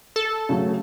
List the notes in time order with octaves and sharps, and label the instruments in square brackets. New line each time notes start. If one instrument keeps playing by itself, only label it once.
[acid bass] A4
[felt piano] C#3 F#3 A3